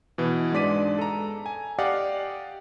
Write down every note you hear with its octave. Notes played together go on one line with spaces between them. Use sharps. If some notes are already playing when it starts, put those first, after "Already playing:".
B2 E3
G#2 G#3 D4 D5 B6 D#7
A4 A#5
G#5
G4 D5 D#5 F5 F#5